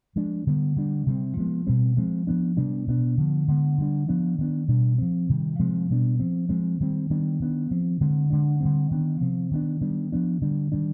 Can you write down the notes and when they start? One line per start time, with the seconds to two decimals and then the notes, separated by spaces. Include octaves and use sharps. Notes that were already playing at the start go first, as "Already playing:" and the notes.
0.16 F3 G#3 D4
0.47 D3 G3 B3
0.76 D3 G3 D4
1.06 C3 G3 C4
1.37 F3 G#3 B3
1.67 B2 G3 C4
1.97 F3 G#3 C4
2.27 F3 B3 D4
2.57 C3 G3 B3 D4
2.87 B2 B3 D4
3.17 D3 F3 B3
3.48 D3 G#3 B3
3.78 D3 G3 D4
4.08 F3 B3 D4
4.38 D#3 B3 D4
4.68 B2 G3 D4
4.98 F3 C4
5.29 C3 D#3 G3
5.59 C3 F3 G#3 C4
5.90 B2 G3 B3 D4
6.20 F3 C4
6.49 F3 G#3 C4
6.80 D#3 G3 C4
7.10 D#3 G3 B3 D4
7.40 D#3 B3 D4
7.71 F3 C4
8.01 D3 G#3 C4
8.30 D3 G#3 D4
8.60 D3 G3 C4
8.91 D#3 B3 D4
9.21 C3 F3 C4
9.51 D#3 B3 D4
9.81 D#3 G3 B3 D4
10.12 F3 B3 D4
10.41 D3 G3 D4
10.72 D#3 G3 D4